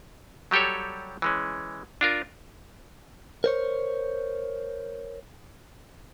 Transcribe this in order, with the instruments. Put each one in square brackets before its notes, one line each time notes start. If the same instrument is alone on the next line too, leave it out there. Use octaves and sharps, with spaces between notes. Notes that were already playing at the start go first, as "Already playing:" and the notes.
[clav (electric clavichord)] F#3 G3 G4 A4 C#5
E3 G#3 C#4
D4 F4 A#4
[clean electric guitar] A#4 C5 C#5